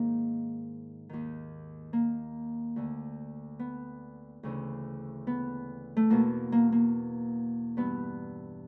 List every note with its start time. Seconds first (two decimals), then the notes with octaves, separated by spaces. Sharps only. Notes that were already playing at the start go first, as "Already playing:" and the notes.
Already playing: G#2 D#3 A#3
1.09 D#2 D#3
1.93 A#3
2.76 D2 D3
3.59 B3
4.43 D2 C#3 E3
5.27 B3
5.97 A3
6.10 E2 B2 A#3
6.52 A#3
6.72 A#3
7.77 G2 E3 B3